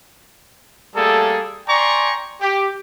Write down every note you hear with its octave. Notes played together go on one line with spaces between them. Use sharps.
G3 A3 A#3 G#4 A4
D5 G5 G#5 A#5 C6 C#6
G4